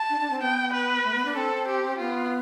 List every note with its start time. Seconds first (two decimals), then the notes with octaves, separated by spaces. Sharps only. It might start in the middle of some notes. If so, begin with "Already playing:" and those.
Already playing: A5
0.10 D4
0.20 D4
0.31 C4
0.41 B3 G5
0.73 B4
1.04 A3
1.15 B3
1.25 D4
1.36 C4 A4
1.68 G4
1.98 B3 F4